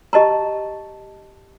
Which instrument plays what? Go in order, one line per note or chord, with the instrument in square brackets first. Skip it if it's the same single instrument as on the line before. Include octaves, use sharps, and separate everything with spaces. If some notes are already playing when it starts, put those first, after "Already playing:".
[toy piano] G4 D#5 A5 A#5